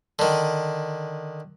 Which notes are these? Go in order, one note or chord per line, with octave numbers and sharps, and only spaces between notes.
D3 D#3